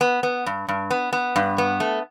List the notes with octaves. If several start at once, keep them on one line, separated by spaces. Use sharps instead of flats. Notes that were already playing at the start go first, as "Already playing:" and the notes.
B3
B3
G2
G2
B3
B3
G2
B3
A3